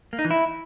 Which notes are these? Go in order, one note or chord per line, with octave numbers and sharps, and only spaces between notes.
A#3
D#4
E3
E4